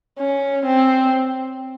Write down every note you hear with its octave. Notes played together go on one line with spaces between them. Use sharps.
C#4
C4